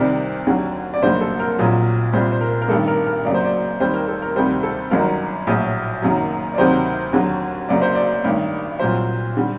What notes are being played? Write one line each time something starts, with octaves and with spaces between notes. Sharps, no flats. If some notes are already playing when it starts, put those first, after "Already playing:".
Already playing: C2 C3 D#3 G3 D5
D#2 D3 F#3
D5
F#1 F#2 D3 G3 C5
A4
A#4
A#1 A#2 F#3
C2 A#2 G3 C5
C5
A#4
A#4
A1 G2 D#3 G3 A4
A#4
A#4
F#1 F#2 F#3 D5
C5
D5
D#2 D#3 G3 C5
A#4
A4
A#4
D2 C3 D#3 G3 C5
A4
G1 F#2 D#3 F#3 A#4
A#1 A2 F#3
F#1 F#2 D#3 F#3
D5
D2 C3 D#3 F#3 C5
D#2 D3 F#3
F#1 F#2 F#3 D5
C5
D5
A1 G2 D#3
C2 A#2 F#3 C5
D3 G3